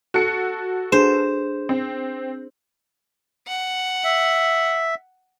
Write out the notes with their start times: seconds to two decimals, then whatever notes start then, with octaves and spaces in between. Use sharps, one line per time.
0.14 F#4 A4 C#7
0.92 D4 G#4 C5 E7
1.69 C4
3.48 F#5
4.04 E5